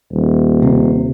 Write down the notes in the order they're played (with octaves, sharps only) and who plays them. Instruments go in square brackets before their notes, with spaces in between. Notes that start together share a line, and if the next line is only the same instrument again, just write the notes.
[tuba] D#1
[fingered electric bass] C3